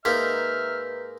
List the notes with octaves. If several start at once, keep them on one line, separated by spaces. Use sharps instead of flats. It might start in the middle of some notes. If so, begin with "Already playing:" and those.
G#2 A#3 D#4 B4 E5 F6 G6 B6